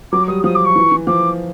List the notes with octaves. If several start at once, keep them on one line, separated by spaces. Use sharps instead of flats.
F#3 D6
G3 D#6
F3 D#6
D6
C#6
E3
E3
F3 D6